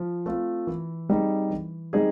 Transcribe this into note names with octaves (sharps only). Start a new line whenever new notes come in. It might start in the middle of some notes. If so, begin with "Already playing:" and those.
Already playing: F3
A3 C4 F4
E3
G3 C4 D#4 G#4
E3
G3 C4 D#4 G#4